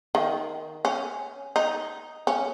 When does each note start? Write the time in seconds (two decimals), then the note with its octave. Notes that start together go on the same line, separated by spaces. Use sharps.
0.15 D#3
0.85 C#4
1.56 D#4
2.27 C#4